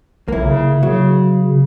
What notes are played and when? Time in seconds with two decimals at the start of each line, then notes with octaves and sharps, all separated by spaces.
0.28 B1 A#3 E4
0.46 C#3
0.83 C#3 F#3